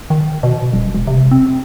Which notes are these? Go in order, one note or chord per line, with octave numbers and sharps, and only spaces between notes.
D#3
B2
D#1
E1
C3
C4